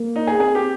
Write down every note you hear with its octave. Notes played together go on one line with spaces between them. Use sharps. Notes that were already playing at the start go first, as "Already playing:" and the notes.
Already playing: A#3
D#4
G#4
C4 G#4
G4